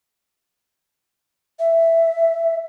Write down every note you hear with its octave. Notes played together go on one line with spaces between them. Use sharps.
E5